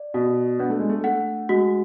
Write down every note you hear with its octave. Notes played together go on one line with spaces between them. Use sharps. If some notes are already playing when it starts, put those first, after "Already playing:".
Already playing: D5
B2 F#4
B3 D4
A3
G#3
A3
A3 F#5
G#3 F#4